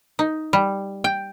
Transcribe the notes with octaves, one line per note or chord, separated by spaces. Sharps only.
D#4
G3
G5